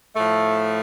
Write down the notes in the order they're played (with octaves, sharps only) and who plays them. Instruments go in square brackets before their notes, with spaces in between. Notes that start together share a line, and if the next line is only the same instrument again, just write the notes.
[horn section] A2 F3 A3